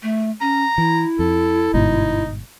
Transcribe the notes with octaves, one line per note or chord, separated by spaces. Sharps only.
A3
C#4 A#5
E3 E4
F2 A4
G1 G#2 B2 D#4